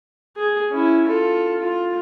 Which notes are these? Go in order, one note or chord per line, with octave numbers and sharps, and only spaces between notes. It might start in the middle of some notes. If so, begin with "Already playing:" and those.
G#4
C#4 E4
F4 A4
F4